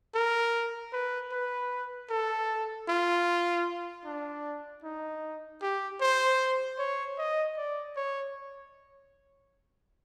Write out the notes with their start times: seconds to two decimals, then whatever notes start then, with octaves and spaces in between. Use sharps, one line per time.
0.15 A#4
0.93 B4
1.32 B4
2.10 A4
2.88 F4
4.05 D4
4.83 D#4
5.62 G4
6.01 C5
6.79 C#5
7.18 D#5
7.57 D5
7.96 C#5